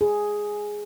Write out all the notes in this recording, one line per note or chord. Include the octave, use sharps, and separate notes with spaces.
G#4